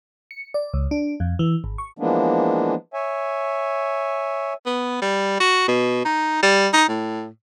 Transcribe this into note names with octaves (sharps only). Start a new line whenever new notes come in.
C#7
D5
C#2
D4
F2
E3
G#1
C#6
E3 F3 G#3 A#3 B3 D4
C#5 E5 G#5
B3
G3
F#4
B2
D#4
G3
D#4
A2